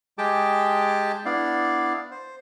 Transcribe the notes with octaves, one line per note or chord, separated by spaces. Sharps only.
G#3 G4 G#4 G5 A5 D6
B3 D4 E4 D5 F5
C5